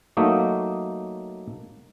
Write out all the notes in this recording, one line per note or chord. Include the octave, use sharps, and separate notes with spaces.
F#3 A3 A#3 D#4